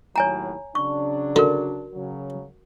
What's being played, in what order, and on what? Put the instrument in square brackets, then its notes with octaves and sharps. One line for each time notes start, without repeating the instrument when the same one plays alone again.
[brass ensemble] D#2 A2 F#3 [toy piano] C#5 G#5 A#5
[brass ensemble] C#3 F#3 D4 [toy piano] C#6
[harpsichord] D3 [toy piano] F#4 A#4
[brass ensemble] C#3 F#3